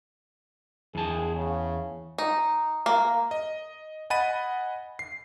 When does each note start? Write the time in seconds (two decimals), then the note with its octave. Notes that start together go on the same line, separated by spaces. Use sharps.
0.95 E2 G#4 A5
1.36 C#3
2.18 D#4
2.86 A#3
3.31 D#5
4.10 D#5 F#5 G#5 B5 A6 D#7
4.99 C7